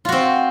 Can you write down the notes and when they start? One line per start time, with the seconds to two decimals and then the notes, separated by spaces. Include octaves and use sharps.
0.05 F4
0.09 F#4
0.12 C4